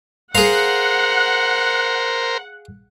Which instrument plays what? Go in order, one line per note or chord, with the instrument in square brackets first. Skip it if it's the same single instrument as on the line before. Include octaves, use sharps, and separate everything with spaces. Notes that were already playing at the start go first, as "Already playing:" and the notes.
[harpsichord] G#4 F5 [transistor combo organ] A#4 C5 [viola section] F#5